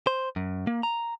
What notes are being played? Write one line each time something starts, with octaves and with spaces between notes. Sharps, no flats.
C5
F#2
A#3
A#5